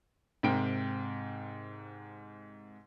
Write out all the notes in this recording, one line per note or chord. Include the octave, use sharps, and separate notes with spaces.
G#2 C3 A#4 G5 D7